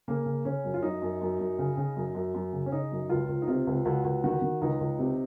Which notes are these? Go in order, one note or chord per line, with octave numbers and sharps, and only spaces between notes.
C#3 A#3
C#3
C#3 C#4
F#2
F4
F#2 D#4
F#2
F#2
F#2
C#3
C#3
F#2
F#2
F#2
C#3
C#4
C#3 D#4
F#2
C#2 F4
C#2
D#4
C3 F4
C#2
C#2 F#4
C#2
D#3 F#4
D#3
C#2 D#4
C#2
C3